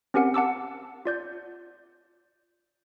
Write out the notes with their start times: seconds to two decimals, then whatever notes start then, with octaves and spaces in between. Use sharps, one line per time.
0.14 C4 C#4 G4 A#4 F#5
0.34 F#5 A5 D6 E6
1.05 F4 D5 G6